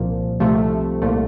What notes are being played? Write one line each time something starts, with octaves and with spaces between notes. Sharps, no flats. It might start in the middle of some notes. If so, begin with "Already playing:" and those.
Already playing: C2 A#2 F3
C2 C3 F3 A3
C2 A#2 A3